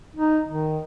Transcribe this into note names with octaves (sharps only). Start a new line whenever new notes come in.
D#4
D#3